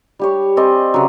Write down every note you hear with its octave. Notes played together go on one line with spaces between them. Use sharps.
G3 G4 C#5
C4 D5 D#5 G#5
C#3 F#3